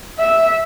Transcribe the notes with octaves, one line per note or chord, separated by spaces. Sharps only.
E5